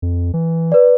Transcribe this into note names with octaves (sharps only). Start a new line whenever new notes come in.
F2
E3
B4 D5